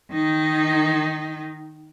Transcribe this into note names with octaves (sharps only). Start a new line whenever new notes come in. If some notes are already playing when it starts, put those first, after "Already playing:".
D#3 D#4